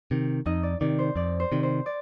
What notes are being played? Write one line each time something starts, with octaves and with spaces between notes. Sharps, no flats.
C3 D#3
F2 D#4 D#5
D5
C3 D#3 D5
C5
F2 D5
C5
C3 D#3
C5
D5